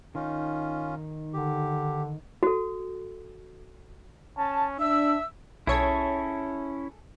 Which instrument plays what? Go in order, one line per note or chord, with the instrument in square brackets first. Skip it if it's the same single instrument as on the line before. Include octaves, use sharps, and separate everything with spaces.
[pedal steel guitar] D#3 D#4 [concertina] C#4 F4
[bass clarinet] D3 [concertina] G4
[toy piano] F#4 A4
[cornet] C#4 [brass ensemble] A5
[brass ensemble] D4 [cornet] E5 [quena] E6
[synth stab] B1 C#5 G#6 [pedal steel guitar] C#4 E4 [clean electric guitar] G#4 A4